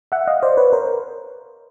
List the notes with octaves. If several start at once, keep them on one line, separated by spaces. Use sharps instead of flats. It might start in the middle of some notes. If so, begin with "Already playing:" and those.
E5 F#5
D#5 F5
C5 D5
B4 C#5
A#4 C5